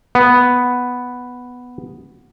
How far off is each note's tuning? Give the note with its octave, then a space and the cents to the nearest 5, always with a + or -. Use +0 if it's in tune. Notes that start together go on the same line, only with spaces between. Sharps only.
B3 +0